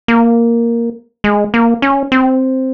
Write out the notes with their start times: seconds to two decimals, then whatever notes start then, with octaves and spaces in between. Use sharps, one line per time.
0.08 A#3
1.24 G#3
1.54 A#3
1.82 C#4
2.12 C4